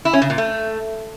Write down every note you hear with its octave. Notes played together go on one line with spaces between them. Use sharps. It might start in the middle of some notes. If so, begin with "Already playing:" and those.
E4
C#4
C#3
A#2
A3